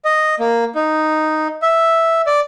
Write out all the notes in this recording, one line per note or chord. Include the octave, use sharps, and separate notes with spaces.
D#5
A#3
D#4
E5
D5